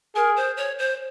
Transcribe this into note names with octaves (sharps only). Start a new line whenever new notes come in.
G#4 A#4
C5
C#5
C5